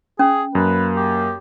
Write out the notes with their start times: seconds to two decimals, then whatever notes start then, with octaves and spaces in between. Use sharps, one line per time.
0.19 C#4 G#4
0.55 F#2 A#3 B4
0.96 G4